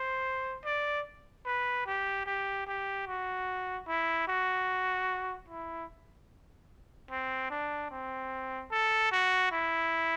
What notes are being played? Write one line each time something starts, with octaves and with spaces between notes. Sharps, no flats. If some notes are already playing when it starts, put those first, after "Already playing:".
Already playing: C5
D5
B4
G4
G4
G4
F#4
E4
F#4
E4
C4
D4
C4
A4
F#4
E4